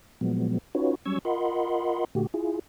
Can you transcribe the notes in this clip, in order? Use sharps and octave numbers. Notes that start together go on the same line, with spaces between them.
A#2 F3 F#3 G#3 B3
C#4 D#4 F4 F#4 B4 C#5
F#3 G3 C#4 C#6 E6 G#6
F4 A#4 D#5 F#5 B5 C6
A#2 D3 A3 F#4 G4
E4 F4 G#4